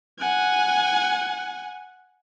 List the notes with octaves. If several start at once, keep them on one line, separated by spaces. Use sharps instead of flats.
F#5 G#5